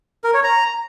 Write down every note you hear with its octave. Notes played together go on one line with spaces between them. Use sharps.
A#4
C#5
A#5